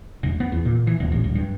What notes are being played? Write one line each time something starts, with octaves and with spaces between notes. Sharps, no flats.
E1
B3
E2
A#2
E3
D#1
A1
D1
G2